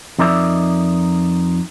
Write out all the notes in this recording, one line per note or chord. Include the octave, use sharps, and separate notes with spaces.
F2 D#4 A#4 D5 E5